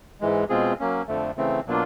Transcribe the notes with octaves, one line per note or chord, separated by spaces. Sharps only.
G#2 E3 G#3
B2 G#3 C4 F4 G#4
F#3 A#3 C#4
F2 D3 F3 A3
C#3 E3 A3 C4
B2 F#3 A#3 D4 F4